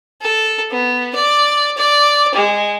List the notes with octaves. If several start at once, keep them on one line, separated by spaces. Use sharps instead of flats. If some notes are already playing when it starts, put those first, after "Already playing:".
A4
B3
D5
D5
G#3